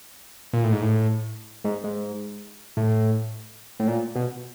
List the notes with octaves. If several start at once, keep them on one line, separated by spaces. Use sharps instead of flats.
A#2
A2
G#2
A2
G#2
G#2
A2
A2
A#2
B2